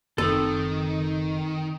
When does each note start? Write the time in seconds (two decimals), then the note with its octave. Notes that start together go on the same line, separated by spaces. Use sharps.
0.18 F#1 D#3 C4 D#4 A4